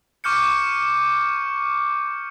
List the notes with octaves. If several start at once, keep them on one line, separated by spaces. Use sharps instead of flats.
C#6 D6 F6 G6 C#7